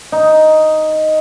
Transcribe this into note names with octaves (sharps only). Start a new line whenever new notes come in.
D#4